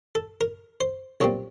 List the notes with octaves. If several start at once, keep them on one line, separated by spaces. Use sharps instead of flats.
A4
A#4
C5
B1 A#2 G3 C4 C#5